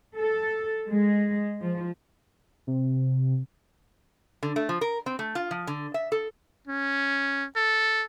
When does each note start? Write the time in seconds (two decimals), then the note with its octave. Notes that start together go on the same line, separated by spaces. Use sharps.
0.18 A4
0.90 G#3
1.61 F3
2.67 C3
4.43 D3
4.56 A3
4.69 F3
4.81 A#4
5.06 C4
5.19 A3
5.35 F4
5.51 F3
5.67 D3
5.94 E5
6.12 A4
6.67 C#4
7.56 A4